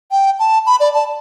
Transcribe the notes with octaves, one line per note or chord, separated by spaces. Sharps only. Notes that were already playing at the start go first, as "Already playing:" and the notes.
G5
A5
B5
D5
A5